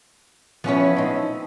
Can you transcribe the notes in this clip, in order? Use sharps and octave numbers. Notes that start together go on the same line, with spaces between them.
F3 B3 C#4 E4 C#5
C4 D#4